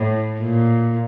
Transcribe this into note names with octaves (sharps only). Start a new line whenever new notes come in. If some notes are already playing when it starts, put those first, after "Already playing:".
Already playing: A2
A#2